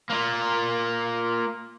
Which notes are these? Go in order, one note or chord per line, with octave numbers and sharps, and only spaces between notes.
A#3 F4